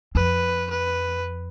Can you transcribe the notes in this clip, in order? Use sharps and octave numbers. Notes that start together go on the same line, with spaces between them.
F2 B4
B4